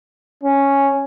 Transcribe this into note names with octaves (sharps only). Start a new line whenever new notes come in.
C#4